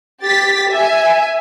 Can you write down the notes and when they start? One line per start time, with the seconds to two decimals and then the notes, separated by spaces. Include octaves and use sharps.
0.22 G4 A6 B6
0.69 E5 G#5